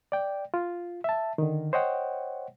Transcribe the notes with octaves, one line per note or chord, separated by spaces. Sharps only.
D5 G5
F4
E5 A5
D3 D#3
C5 C#5 D#5 F#5 G5